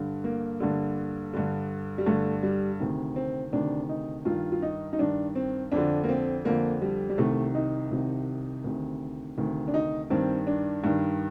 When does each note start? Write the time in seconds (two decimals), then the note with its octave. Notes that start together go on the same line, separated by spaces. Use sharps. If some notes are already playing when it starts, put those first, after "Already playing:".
Already playing: G2 D3
0.24 A#3
0.60 G2 D3
1.33 G2 D3
1.98 G3
2.06 G2 D3 A3
2.43 G3
2.80 D2 C3 D#3
3.16 C4
3.52 D2 C3 D#3 D4
3.89 D#4
4.25 G2 D#3 F4
4.52 F4
4.62 D#4
4.93 D#4
4.99 G2 D#3 D4
5.35 C4
5.72 F2 D3 D4
6.04 A#3
6.09 C4
6.45 F2 D3 A#3
6.82 G3
7.09 G3
7.18 C2 C3 D#3 A3
7.55 D#4
7.91 C2 C3 D#3
8.64 D2 C3 D#3
9.37 D2 C3 D#3
9.68 D4
9.74 D#4
10.10 G2 D#3 C4
10.47 D4
10.84 G2 D#3